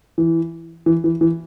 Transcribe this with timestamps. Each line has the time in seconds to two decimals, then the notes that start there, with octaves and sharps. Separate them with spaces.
0.18 E3
0.86 E3
1.04 E3
1.21 E3